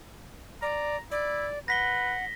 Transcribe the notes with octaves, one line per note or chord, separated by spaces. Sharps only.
D5 A#5
E4 D5
B4 F#5 A#6 B6 G7